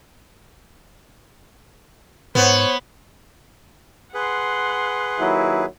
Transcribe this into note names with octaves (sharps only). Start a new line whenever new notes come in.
G#2 B3 C5 C#5
G#4 B4 F#5 C6
D#2 F#3 E4